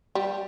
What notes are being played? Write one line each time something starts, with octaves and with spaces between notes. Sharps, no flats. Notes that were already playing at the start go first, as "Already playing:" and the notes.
G3